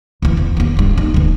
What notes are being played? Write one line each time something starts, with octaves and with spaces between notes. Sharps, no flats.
D2 E3
E2
D#2 A#3
D1 G2
D#4
D1 E3